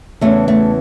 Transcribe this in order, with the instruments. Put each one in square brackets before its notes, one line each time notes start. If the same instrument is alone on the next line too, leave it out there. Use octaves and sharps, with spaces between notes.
[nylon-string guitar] E2 C#3 E3 A3
A3